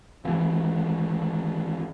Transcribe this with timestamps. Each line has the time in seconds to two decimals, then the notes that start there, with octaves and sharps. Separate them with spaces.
0.25 G#1 E3